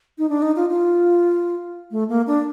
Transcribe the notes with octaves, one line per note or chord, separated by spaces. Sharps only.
D#4
D4
D#4
F4
F4
A3
A#3
D4